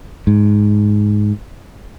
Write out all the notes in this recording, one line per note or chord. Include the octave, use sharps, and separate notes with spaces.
G#2